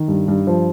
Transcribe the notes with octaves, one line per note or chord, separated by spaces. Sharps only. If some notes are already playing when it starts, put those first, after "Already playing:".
Already playing: D#3
G2
G2
F3